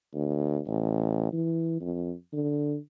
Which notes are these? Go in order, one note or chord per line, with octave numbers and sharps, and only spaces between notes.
D2
A1
E3
F2
D3